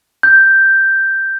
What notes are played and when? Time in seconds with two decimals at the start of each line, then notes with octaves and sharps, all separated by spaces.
0.23 G6